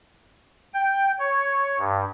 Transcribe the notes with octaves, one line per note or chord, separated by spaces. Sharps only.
G5
C#5
G2